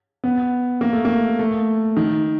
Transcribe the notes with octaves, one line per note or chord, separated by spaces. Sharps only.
B3
A#3
A3
A#3
A3
D#3